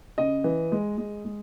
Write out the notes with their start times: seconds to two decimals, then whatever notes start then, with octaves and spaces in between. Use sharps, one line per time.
0.18 C#3 D#5
0.44 E3
0.72 G#3
0.98 G#3
1.25 G#3